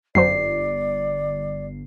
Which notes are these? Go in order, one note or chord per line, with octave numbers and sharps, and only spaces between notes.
G1 F#2 F#3 C5 D5 C7